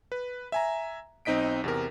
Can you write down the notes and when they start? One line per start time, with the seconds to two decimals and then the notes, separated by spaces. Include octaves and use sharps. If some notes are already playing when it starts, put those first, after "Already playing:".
0.12 B4
0.52 E5 G#5 A#5
1.25 B1 C4 D#4 D#5 B6 D7
1.64 E2 C3 A#4